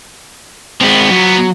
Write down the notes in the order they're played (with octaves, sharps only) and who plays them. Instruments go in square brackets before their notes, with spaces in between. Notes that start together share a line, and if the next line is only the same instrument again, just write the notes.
[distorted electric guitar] F3 B3 [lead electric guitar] G#3 C4
[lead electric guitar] F#3